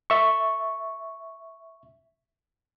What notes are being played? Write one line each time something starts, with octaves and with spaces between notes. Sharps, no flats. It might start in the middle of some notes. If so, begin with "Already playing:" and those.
E5 C#6